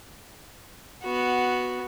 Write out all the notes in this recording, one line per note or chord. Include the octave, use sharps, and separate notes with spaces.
B3 F#4